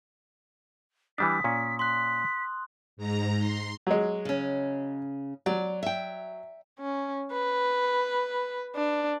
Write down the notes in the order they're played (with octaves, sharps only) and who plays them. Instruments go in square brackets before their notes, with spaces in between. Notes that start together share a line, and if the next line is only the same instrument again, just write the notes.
[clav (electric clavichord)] E3 G3 D4 [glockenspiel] D#6 [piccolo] B6
[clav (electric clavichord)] A#2 C#4
[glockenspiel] C6 F#6 [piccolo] B6
[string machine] G#2 A#5
C6
[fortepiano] F#3 G#3
[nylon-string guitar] C#3 C#4
[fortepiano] F#3 [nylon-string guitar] D5
[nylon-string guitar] E5 G5
[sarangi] C#4
B4
D4